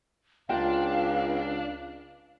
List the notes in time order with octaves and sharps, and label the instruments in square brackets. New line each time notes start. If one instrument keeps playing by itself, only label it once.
[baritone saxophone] C#2 [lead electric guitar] D4 [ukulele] F4 A#4 G5 [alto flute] F5